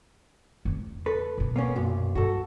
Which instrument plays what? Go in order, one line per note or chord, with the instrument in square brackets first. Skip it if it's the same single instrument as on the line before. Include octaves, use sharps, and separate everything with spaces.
[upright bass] E2 C#3
[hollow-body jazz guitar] A4 B4
[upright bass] B2 D3
[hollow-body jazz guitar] A#3 B3 C#4
B1 F#2 A#2
[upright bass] G2 [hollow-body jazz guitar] F#4 A4